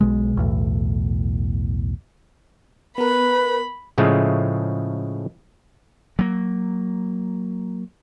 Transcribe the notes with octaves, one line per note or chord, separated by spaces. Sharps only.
B1 B2 G#3
B1 E2 A2
B3 A#4 B4 B5
A2 C#3 F3 G#3 A3
F#3 A#3